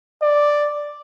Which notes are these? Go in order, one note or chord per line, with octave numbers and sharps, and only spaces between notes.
D5